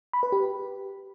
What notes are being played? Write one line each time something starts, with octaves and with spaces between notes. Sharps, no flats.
B5
B4
G4